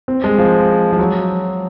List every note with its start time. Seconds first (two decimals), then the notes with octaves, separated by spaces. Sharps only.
0.08 C4
0.24 G#3
0.38 F3
0.92 F3
0.99 F#3